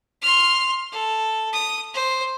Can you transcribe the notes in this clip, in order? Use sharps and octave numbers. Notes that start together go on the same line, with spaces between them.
C6 F6
A4
D#6
C5